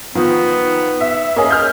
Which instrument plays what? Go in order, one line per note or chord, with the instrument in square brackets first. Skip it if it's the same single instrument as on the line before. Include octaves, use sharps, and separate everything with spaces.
[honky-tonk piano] D#3 F3 [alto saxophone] B3
[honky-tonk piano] E5
[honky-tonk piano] A#3 C#4 G#4 [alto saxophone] D#5
[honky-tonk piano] F6 G6